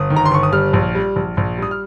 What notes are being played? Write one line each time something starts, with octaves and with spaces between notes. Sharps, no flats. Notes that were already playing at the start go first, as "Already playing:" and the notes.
Already playing: G1 D#6
D#3
A#5
C6
G1 C#6
D#6
G3 F6
A#1
G3
A#1
A#1
G3 D#6
F6